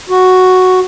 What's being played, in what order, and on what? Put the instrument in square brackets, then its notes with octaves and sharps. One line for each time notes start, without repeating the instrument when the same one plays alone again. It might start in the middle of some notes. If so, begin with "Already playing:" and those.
[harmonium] F#4